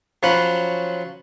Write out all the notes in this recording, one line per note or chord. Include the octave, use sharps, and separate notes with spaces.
F3 F#3 C#4 C5 F#5 B5